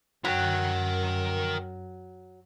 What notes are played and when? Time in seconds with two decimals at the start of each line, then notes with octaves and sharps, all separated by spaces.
0.25 F#2 F#3 A#4 G5